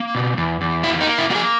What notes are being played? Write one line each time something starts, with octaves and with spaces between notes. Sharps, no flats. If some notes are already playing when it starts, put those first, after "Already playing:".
Already playing: A#3
B2
E2
E2
A#3 E4
D#4
A#3
E4
A#3 F#4 G#4